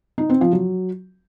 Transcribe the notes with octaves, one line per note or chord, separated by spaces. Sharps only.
D#4
C4
F3
F#3